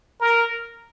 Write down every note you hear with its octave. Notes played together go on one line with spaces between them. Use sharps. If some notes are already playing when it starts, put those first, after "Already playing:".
A#4